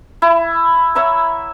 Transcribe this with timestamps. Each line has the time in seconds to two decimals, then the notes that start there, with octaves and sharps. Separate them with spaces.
0.22 E4
0.95 C#5 E5 F#5 A#5